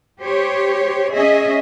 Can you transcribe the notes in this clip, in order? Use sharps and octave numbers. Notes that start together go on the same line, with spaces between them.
G4 C5 C#5
C#4 G#4 D#5 E5